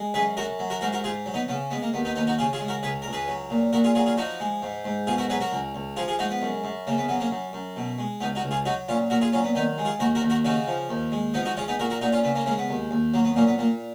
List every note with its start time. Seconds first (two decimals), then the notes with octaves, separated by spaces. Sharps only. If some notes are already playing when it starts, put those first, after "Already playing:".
Already playing: G#3
0.14 F#2 G#4 B4
0.37 F#2 F#4 A#4
0.59 F#3
0.70 F#4 A#4
0.81 G#2 F#4 A#4
0.92 F#4 A#4
1.04 G#2 F4 G#4
1.26 F#3
1.34 B3 D#4
1.48 C#3 B3
1.71 G#3 B3
1.82 A#3
1.93 D#2 B3
2.05 B3 D#4
2.15 D#2 B3 D#4
2.27 D#4 F#4
2.39 C#3 F4 G#4
2.53 F4 G#4
2.60 G#3
2.68 F#4 A#4
2.83 C#2 G#4 B4
3.02 C#2 A#4
3.13 G#4 B4
3.28 F#3
3.50 A#2
3.73 A#2 F#4 A#4
3.84 F4 G#4
3.95 F#3 F4 G#4
4.06 F4 G#4
4.17 F3 D#4 F#4
4.40 G#3
4.62 G#2
4.85 G#2
5.07 B2 F4 G#4
5.18 F#4 A#4
5.30 F#3 G#4 B4
5.41 F#4 A#4
5.52 C#2
5.75 C#2
5.96 F3 F4 G#4
6.08 F4 G#4
6.19 G#3 D#4 F#4
6.30 B3
6.42 F#2
6.64 F#2
6.87 C#3 A#3
6.98 B3
7.09 F#3 B3
7.20 A#3 C#4
7.31 F#2
7.53 F#2
7.76 B2
7.98 G#3
8.21 C#2 B3 D#4
8.35 D#4 F#4
8.43 C#2
8.51 F4 G#4
8.65 F#3 D#4 F#4
8.88 A#2 C#4 F4
9.10 A#2 F#4 A#4
9.21 F4 G#4
9.33 F#3 C#4 F4
9.44 B3
9.55 D#3 B3 D#4
9.78 G#3
9.85 F4 G#4
10.00 D#2 F#4 A#4
10.15 F#4 A#4
10.22 D#2
10.30 F#4 A#4
10.45 C#3 D#4 F#4
10.67 F3
10.89 D#2
11.12 G#3
11.34 F3 B3 D#4
11.45 D#4 F#4
11.57 G#3 C#4 F4
11.68 B3 D#4
11.79 A#2 F#4 A#4
11.90 F#4 A#4
12.01 A#2 D#4 F#4
12.12 C#4 F4
12.23 C#3 B3
12.35 A#3 C#4
12.46 G#3 A#3 C#4
12.58 B3
12.69 D#2
12.91 D#2
13.14 F#3 A#3
13.25 B3
13.36 A#2 A#3 C#4
13.47 B3
13.58 A#2 A#3